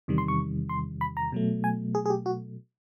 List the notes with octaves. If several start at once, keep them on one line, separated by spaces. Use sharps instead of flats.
E2 C3 D#3 G3
C6
C#6
C6
B5
A#5
B2 F#3 A3
G#5
G#4
G#4
G4
F#4